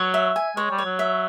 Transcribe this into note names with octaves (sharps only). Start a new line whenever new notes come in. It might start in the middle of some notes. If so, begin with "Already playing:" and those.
Already playing: F#3 C#5
E5
G#5
G#3 C#5
G3
C#5
F#3
E5